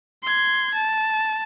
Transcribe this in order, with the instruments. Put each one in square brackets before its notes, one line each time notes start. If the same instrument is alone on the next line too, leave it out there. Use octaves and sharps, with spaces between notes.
[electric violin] C6 G#6
A5